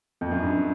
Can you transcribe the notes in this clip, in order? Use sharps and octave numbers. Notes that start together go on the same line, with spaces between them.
F2
F#2
G2